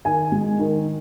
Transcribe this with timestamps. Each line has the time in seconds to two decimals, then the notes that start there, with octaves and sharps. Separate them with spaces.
0.05 D#3 G#5
0.32 G#3
0.59 D#3